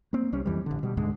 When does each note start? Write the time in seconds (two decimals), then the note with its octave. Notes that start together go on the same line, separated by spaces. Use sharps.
0.13 A#3 C4
0.32 C2 G3 C#4
0.45 F2 E3 G3
0.66 A1 D3
0.83 B2 G3
0.97 D2 G#2 D3 G#3